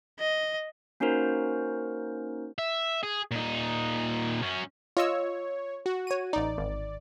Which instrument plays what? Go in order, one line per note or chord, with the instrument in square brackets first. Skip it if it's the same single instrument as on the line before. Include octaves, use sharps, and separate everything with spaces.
[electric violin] D#5
[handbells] A#3 C#4 D#4 F#4 A#4 C5
[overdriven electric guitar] E5
G#4
A#2 D#4
F#2 C#4
[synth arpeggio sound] F4 D#5 E6 [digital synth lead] C#5
[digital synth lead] F#4
[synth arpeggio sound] C#5 D#7
[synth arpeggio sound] A1 D#4 [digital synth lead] D5
[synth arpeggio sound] G#1